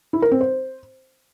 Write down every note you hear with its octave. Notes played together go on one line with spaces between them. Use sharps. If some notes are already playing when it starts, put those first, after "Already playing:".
E4
A#4
C4
C5